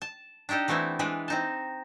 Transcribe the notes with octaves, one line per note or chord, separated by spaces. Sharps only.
A5
D4 D#4 G4 A4 D#5
E3 A3 B3 C4 E4
E3 G#3 D4 B4 D5
C4 D#4 A5